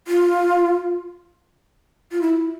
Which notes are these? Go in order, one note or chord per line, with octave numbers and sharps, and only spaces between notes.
F4
F4
E4